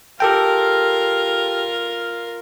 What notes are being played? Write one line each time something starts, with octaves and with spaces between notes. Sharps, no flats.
F4 G4 A4 A#4 G5